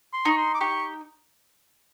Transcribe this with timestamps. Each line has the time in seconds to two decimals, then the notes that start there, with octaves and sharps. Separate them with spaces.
0.13 C6
0.25 D#4 C#6
0.37 C6
0.54 D6
0.61 G4 C#6